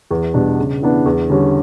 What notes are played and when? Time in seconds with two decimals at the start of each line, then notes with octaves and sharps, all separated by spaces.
0.11 E2
0.34 B2 G3 D4
0.59 C#3
0.82 E3 B3 D4
1.06 E2
1.30 D3 G3 C#4